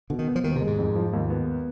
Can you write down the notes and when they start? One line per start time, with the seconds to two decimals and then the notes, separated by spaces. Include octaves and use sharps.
0.10 B2 D3
0.19 D#3
0.28 B3
0.36 F3
0.44 D#2 D#3
0.56 C3
0.61 G#3
0.67 G#2
0.78 F2
0.95 F3
1.13 D#2
1.30 B3